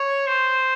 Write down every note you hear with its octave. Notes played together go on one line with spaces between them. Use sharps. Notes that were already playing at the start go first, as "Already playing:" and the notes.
Already playing: C#5
C5